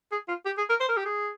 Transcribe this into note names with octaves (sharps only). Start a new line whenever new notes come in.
G#4
F4
G4
G#4
A#4
C5
A#4
G4
G#4